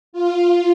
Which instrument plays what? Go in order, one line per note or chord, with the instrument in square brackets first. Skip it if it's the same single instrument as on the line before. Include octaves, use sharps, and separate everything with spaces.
[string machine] F4